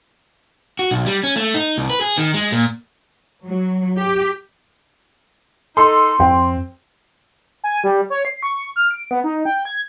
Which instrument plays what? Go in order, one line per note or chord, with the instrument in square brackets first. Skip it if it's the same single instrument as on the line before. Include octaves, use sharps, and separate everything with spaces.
[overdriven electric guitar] F#4
B1
G3
C#4
A3
D#4
C2
B4
G#4
D#3
G#3
A#2
[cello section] F#3
G4
[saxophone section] D#4 A4 [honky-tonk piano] C6
[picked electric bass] F2 [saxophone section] C4 [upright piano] G5
[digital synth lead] G#5
G3
C#5
C7
C#6
F6
D7
B3
D#4
G5
G#6